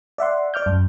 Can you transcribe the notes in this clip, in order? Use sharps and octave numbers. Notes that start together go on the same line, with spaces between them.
D5 E5 F#5 C6
D5 D6 F6 G6
F#2